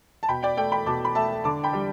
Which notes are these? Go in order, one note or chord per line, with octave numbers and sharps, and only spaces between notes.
A5
B2 G5 B5
D5 G5
A3 D5 G5
G5 B5
B2 A5 D6
B5
A3 E5 A5
D3 A5 D6
G5 B5
G3